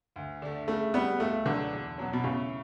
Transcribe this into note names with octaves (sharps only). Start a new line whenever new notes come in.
D2
D3 A3
C#3 A3
G3 B3 D4
C#2 A3
B2 D3 F#3 B3 D4
E2
B2 F#3 C#4
B2
A2 C#3